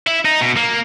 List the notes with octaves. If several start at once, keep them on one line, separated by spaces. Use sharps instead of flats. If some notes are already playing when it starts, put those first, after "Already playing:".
E4
D#4
B2
A#3